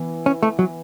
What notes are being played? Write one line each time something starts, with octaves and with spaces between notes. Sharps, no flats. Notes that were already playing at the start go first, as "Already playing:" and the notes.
Already playing: E3 B3
C#4
A3
F#3